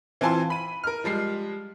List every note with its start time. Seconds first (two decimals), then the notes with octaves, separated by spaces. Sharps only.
0.21 E3 C4 F4 G#5 A5 C6
0.50 B5 D#7
0.84 A#4 F6
1.04 F3 G3 G#3 C7